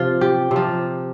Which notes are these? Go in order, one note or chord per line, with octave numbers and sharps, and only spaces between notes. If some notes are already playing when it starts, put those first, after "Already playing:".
Already playing: C3 F3 F4
G4
C3
F3